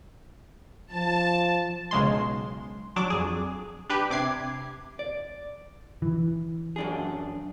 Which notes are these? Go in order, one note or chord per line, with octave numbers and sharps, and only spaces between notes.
F3 A5
B1 C#3 G#3 C6
F#3 D4 D6
F2 G#4
D4 G4 B4
C3 D6 G#6 C7
D5
E3
F#2 D4 G#4